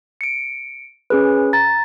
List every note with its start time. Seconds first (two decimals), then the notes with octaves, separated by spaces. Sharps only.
0.21 C#7 D7
1.10 C#4 G#4 B4
1.53 A#5 A6